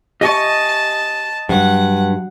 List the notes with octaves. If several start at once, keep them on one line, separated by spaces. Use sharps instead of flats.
G4 D#5 E5 G#5 A5 C#6
G2 F#3 F#5